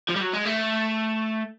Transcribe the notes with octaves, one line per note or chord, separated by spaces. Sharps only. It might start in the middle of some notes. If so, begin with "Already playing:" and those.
F3
G3
F#3
G#3
A3